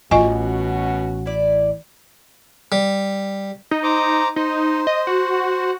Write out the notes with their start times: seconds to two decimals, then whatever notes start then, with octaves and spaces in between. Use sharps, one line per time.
0.11 A1 B2 E3 C#4 F4 F#4 D#5 G#5
1.26 E4 D5
2.72 G3
3.71 D#4
3.83 C5 A#5 D6
4.36 D#4 C5
4.87 D#5
5.07 F#4